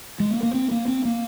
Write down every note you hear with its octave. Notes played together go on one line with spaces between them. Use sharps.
G#3
A#3
A#3
C4
A#3
C4
A#3